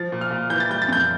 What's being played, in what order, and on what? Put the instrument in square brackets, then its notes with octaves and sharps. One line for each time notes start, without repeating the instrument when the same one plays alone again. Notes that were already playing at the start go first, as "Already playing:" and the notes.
Already playing: [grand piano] F3 A6
A#2
F6
A#2
E3 G6
A6
G3 G6
A6
F2 G6